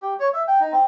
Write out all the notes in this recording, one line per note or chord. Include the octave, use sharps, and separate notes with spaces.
G4
C#5
E5
G5
D#4
C4